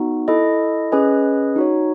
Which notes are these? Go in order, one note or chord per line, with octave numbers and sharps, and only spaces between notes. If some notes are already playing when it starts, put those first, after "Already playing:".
Already playing: B3 D#4 F#4
E4 A4 D#5
C#4 G#4 B4 D#5 G#5
D#4 F#4 C#5